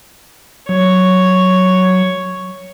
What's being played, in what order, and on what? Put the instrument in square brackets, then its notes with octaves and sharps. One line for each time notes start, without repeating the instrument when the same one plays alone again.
[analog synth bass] F#3 [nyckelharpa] C#5